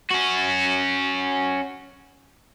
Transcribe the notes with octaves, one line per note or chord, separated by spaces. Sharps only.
C#4 F#4